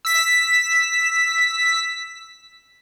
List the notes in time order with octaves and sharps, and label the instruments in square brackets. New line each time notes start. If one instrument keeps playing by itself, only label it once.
[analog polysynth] E6 B6